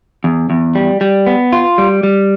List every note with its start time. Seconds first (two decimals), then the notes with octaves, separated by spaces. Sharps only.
0.24 E2
0.50 E2
0.75 G3
1.01 G3
1.27 B3
1.52 F4
1.78 G3
2.03 G3